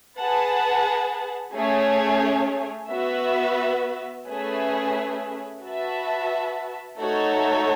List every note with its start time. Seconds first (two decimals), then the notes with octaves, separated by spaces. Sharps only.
0.19 G#4 B4 F#5 A5
1.55 A3 C#4 G#4 C#5
2.91 B3 F#4 B4 E5
4.28 A3 C#4 G#4 B4 E5
5.64 F#4 B4 E5 A5
7.00 A3 D#4 F#4 A4 C#5